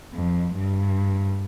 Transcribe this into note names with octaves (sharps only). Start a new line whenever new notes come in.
F2
G2